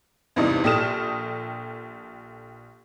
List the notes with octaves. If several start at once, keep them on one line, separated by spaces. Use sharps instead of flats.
E2 G2 C3 D#4
A#1 G4 A4 D#6 F6 E7